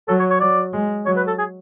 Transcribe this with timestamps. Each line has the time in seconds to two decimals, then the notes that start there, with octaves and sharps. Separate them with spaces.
0.08 F#3 A4
0.19 C#5
0.30 C#5
0.40 F#3 D5
0.73 G#3
1.06 F#3 C#5
1.16 B4
1.27 A4
1.38 G#4